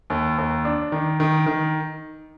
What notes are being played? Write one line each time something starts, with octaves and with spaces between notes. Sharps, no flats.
D#2
D#2
D4
D#3
D#3
D#3